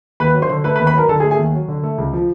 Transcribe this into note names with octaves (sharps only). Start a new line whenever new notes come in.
D#2 B4 B5
F#3
C5 C6
D3
A3 B4 B5
B4 B5
D#2
B4 B5
F#3 A#4 A#5
D3 A4 A5
G#4 G#5
A3
G#4 G#5
D#2
F#3
D3
A3
C#2
F3